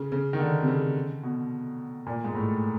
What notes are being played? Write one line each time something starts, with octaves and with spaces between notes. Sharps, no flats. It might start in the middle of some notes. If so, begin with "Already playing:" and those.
Already playing: C#3
C#3
D#3
D3
C3
C#3
B2
A#2
G#2
A2